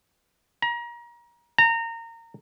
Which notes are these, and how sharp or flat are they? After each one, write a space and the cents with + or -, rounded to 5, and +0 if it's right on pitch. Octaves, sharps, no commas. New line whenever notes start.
A#5 +30
A#5 -25